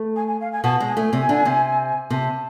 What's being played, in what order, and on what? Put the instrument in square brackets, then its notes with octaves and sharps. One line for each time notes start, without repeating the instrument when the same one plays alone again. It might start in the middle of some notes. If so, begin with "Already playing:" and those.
Already playing: [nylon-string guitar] A3
[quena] G#5
G#5
F5
G#5
[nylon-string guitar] B2 B3 [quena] A5
[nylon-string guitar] G#3 [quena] A5
[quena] G#5
[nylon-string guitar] A3
C3 C4
D3 D4
C3 C4
[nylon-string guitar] C3 C4 [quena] A5